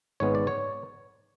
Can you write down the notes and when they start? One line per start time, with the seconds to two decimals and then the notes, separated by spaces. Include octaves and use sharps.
0.20 G#1 G#2 G#3 B3 C#5
0.35 D5
0.47 C#5